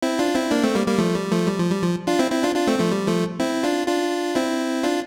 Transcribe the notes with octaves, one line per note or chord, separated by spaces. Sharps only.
C4 E4
D4 F4
C4 E4
A#3 D4
A3 C4
G3 A#3
G3 A#3
F3 A3
G3
F3 A3
G3
F3
G3
F3
D4 F4
C4 E4
C4 E4
D4 F4
D4 F4
A3 C4
F3 A3
G3
F3 A3
C4 E4
D4 F4
D4 F4
C4 E4
D4 F4